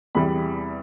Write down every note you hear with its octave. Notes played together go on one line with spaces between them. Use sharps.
E2 C3 E3 G3 B5